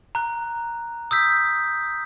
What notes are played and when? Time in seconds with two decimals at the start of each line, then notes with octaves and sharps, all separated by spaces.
0.15 A#5 F#6
1.11 D#6 E6 G6 B6